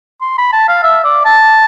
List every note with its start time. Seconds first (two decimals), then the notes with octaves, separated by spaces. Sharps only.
0.21 C6
0.38 B5
0.53 A5
0.69 F5
0.83 E5
1.04 D5
1.25 A5